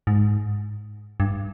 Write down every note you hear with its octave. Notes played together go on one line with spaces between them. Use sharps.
G#2
G2